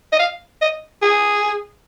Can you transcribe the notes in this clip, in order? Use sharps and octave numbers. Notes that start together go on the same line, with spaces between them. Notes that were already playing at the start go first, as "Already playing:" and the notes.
D#5
F5
D#5
G#4